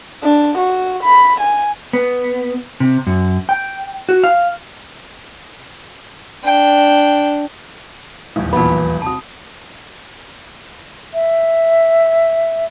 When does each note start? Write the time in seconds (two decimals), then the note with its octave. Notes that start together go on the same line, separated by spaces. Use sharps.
0.23 D4
0.58 F#4
1.03 B5
1.40 G#5
1.93 B3
2.80 C3
3.07 F#2
3.49 G5
4.09 F#4
4.24 F5
6.44 D4 G5
8.36 D#1 B1 E2
8.53 A#2 E3 B3 A5 B5
9.02 C3 F#4 A5 D#6
11.14 E5